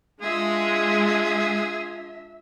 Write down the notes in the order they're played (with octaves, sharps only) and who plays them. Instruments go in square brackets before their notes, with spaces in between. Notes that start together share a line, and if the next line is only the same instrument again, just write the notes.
[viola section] G#3 [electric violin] D4 E5 [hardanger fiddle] F4 [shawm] G#4